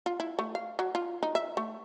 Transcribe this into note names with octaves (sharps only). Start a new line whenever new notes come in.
F4
E4
A3
F5
F#3
F4
D#4
E5
A3